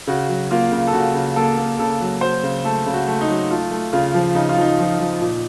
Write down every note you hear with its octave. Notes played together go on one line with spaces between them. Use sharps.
C#3 F#4
F#3
A#3 F4
C#3
A4
C#3 F#4
C#3
A#3 A4
A#3
C#3 A4
F#3
F#3 C5
C#3
A3 A4
C#3
F#4
A3
D#4
F#3
A3 F4
A3
C#3 F4
F3
C#3 D#4
F4
F3 D#4
F3
F3
A#2